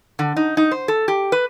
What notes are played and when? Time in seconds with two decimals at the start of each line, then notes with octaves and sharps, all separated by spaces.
0.19 D3
0.37 D#4
0.57 D#4
0.71 C5
0.88 A4
1.08 G4
1.32 B4